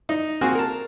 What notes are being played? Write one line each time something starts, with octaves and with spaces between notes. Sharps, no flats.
D#4
A#3 C4 F#4 G#4
A#4 A5